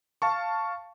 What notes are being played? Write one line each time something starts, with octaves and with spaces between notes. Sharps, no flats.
F5 A5 C#6